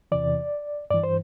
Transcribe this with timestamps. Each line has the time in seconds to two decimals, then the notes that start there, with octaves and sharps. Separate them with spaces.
0.12 E2 C3 E3 D5
0.90 G2 E3 D5
1.03 C5